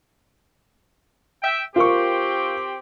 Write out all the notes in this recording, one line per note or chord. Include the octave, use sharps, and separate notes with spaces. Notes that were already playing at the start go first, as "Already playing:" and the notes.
E5 G5
C4 F4 G4 A#4 C#6